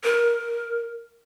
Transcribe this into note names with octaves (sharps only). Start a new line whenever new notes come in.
A#4